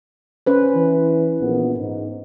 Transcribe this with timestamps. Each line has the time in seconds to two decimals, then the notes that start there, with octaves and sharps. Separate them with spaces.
0.46 C#4 B4 C5
0.75 E3
1.41 A#1 B3
1.76 G#2